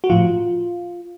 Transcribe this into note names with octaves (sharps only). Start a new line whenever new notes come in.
F#4
A2 F3 F4